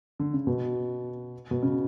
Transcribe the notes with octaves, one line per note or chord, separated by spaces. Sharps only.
D3
C#3
B2
B2
C#3